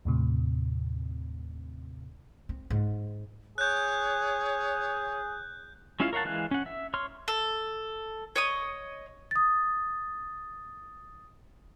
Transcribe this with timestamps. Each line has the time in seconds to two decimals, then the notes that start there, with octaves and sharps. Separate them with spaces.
0.05 D#2 A2 C3
2.49 C4
2.70 G#2
3.58 G#4 C#5 F#6 G6
6.00 G#3 C#4 E4 F4 F5
6.13 A#4 C#5 F5 F#5 A5
6.25 E3 G#3 F5 F#6
6.51 C#4 F#5
6.66 E5
6.94 C#5 C6 F6
7.28 A4
8.36 C#5 D#5 D#6
9.31 D#6 A6